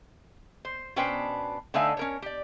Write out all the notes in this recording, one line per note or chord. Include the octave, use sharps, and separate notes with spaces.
C5
B2 C#4 D4 B4 C5 G5
D3 A3 D#4 E5 F5 G#5
C#4 A#4 C#5
G4 D5